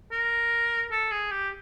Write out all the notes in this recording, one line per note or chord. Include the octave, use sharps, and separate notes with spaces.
A#4
A4
G#4
G4